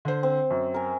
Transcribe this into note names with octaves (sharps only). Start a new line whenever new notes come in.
D3 C5
C4
F#2
A#4 G#5